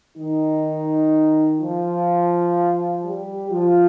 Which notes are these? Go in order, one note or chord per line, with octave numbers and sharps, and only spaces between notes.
D#3 D#4
F3 F4
G3 G4
F3 F4